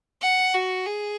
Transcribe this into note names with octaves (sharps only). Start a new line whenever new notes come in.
F#5
F#4
G#4